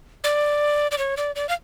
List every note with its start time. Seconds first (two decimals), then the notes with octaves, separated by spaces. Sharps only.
0.24 D5
0.91 D5
0.98 C#5
1.17 D5
1.36 D5
1.49 F5